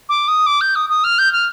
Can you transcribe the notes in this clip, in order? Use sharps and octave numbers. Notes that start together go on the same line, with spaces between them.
D6
D#6
D6
G6
D#6
D#6
F6
G6
F6